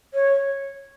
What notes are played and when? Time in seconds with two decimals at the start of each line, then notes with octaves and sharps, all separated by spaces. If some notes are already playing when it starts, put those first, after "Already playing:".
0.14 C#5